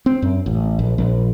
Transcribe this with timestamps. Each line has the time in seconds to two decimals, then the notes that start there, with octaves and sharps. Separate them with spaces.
0.06 C4
0.22 F#2
0.46 A1
0.79 A#1
0.98 A#1